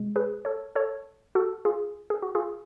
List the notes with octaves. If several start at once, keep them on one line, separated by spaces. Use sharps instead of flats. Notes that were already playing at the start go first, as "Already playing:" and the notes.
Already playing: B2 G#3
G#4 B4
A4 C#5
A4 C#5
F#4 A4
F4 G#4
G#4
F#4
F4 G#4